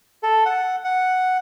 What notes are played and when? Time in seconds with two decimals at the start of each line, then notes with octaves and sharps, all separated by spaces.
0.23 A4
0.46 F#5
0.84 F#5